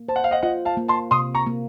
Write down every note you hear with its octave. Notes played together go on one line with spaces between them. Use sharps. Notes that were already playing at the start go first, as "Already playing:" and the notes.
Already playing: A#3
C5 A5
F#5
F5
D#5 F#5
F4 D#5 F#5
F5 A5
A#3
A5 C6
C3 C6 D#6
A#5 C#6
A#3